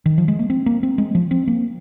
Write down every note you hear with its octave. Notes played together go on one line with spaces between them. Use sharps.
D#3
F3
G#3
A#3
C4
A#3
C4
G#3
F3
C4
A#3